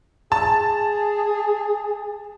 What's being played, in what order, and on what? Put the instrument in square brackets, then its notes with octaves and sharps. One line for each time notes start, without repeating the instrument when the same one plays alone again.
[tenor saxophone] G#4 [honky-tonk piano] A5